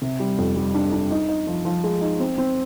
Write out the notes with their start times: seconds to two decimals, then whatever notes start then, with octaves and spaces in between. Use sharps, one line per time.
0.02 C3
0.20 G3
0.38 F2
0.56 G3
0.74 D4
0.92 D4
1.11 D#4
1.28 D#4
1.47 F3
1.65 F3
1.84 G#3
2.01 D#4
2.20 C4
2.38 C4